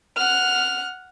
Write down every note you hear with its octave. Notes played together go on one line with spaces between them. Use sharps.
F#5 F6